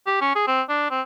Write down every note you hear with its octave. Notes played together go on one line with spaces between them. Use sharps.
G4
C#4
G#4
C4
D4
C4